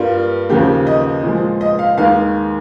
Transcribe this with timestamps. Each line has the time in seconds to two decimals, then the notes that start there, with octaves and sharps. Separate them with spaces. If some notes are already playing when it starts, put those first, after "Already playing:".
Already playing: G2 G3 A#3 F4
0.49 D#2 C#3 F3 A#3 G4
0.87 D#5
1.24 A#2 F3 G#3
1.61 D#5
1.79 F5
1.98 D#2 D#3 G#3 F5